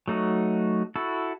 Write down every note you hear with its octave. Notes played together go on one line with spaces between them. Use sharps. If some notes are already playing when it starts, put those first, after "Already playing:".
F#3 A3 D#4 F#4
E4 F#4 A4